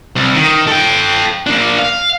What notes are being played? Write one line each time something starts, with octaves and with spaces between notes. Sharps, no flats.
C2
D#3
A4 G5
A#3 D4
F5